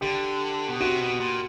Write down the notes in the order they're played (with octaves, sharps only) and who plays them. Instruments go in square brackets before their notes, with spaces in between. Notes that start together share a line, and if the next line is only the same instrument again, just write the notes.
[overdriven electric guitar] D3 [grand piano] G4
[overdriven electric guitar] B2
[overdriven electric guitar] C3 [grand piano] F#4
[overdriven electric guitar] B2
A#2